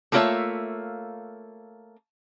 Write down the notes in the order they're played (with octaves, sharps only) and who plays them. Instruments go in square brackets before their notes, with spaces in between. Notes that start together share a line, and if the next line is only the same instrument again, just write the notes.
[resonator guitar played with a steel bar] A3 A#3 F4 A#4 C#5 E5